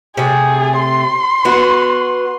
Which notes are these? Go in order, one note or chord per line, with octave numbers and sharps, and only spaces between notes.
C3 A3 G#4
C6
B3 F#4